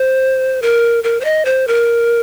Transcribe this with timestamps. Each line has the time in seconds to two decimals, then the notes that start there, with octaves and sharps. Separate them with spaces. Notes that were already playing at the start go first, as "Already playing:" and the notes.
Already playing: C5
0.62 A#4
1.04 A#4
1.21 C5
1.25 D#5
1.45 C5
1.68 A#4